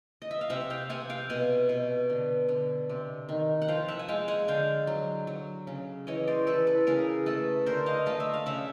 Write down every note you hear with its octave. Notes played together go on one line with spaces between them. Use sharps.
D#5
E5
F5
C3 E5 F#5
F5 G5
C3 F#5 G#5
F5 G5
B2 F#5 G#5
B2
D3
D3
C3
D#3
F#5
F3 F5 G5
E5 F#5
G#5
G#3 F5 G5
F#5 G#5
D3 F5 G5
F#3
F#3
C#3
E3 C#5 D#5
C5 D5
E3 A4 B4
A4 B4
C#3 G#4 A#4
A3 A4 B4
D3 A#4 C5
D#5 F5
A3 D#5 F5
E5
F5
C#3 E5 F#5